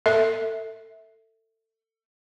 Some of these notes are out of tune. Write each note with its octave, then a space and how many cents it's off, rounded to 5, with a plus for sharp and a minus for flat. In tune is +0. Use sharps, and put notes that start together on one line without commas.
A4 +25 E5 -15